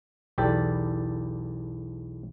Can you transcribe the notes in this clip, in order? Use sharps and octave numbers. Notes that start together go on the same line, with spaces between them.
B1 E2 G4 A4 D5